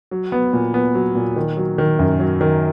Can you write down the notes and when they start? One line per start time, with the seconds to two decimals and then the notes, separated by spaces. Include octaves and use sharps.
0.11 F#3
0.32 B3
0.53 A#2
0.74 B3
0.94 F#3
1.15 A#2
1.36 D#3
1.57 F#3
1.78 D#3
1.99 F#2
2.19 F#3
2.41 D#3